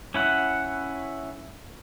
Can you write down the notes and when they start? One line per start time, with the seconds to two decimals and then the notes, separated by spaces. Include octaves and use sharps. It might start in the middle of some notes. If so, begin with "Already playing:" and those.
0.14 C#4 E4 F#5